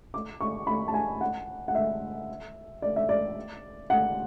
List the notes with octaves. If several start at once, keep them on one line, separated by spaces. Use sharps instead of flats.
D6
C#6
B5
A5
G#5
F#5
F#5
E5
D5
E5
D5
F#5